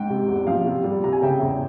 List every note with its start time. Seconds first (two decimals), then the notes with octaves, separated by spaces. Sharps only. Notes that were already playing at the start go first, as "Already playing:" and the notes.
Already playing: G#2 G5
0.10 C3
0.28 E2
0.47 F3 F5
0.67 C3
0.84 G3
1.04 C3 A#5
1.13 G#5
1.22 C#3 E5 G5
1.42 E2